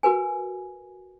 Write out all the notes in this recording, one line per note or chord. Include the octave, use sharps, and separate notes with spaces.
F#4 A#4 B4 G#5